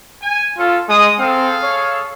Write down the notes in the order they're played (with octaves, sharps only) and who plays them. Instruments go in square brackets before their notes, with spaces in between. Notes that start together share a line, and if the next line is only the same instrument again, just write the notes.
[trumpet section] G#5
[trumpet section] C#4 A4 [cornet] F4
[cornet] G#3 [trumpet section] D#5 D#6
[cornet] C4 [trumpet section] G#4 A4 F5
[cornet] C#5